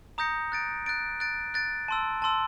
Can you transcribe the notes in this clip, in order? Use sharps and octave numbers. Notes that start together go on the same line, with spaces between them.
A#5 D#6 G6 A#6 C#7
F#6 A6 D7
F#6 A6 D7
F#6 A6 D7
F#6 A6 D7
A5 C6 E6
A5 C6 E6